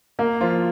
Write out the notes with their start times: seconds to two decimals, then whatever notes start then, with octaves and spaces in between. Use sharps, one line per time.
0.19 A#3
0.41 F3 F4